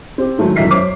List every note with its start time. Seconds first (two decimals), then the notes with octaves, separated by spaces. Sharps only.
0.18 C4 G4
0.38 D#3 F#3 G#3 A3 D#4
0.56 E1 F#2 E5 B6 C7
0.71 F#2 C5 C#5 D6